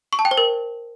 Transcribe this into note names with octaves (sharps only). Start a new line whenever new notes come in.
C#6
A5
G5
C5
A#4